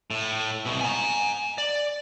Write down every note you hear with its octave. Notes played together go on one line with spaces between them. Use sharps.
A2
C2 B2
G#5 A#5
D5